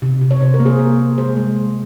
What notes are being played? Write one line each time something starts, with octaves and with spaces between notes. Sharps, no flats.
C3
C3
C#5
C3 C5
A#4
A#3
G#4 C5
A#3
A#3
G#3 G#4 C5
G#3
G#3